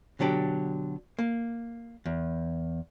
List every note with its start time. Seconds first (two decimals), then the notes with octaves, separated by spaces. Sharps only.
0.19 B2 D3 F#3 D4 G4
1.19 A#3
2.06 E2